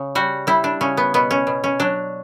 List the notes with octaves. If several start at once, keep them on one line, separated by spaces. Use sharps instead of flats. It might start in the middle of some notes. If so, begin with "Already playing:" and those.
Already playing: C#3
G3 F#4
G3 E4
D4
C#3 C#4
B3
B2 B3
C#4
B2
C#4
F#3 D4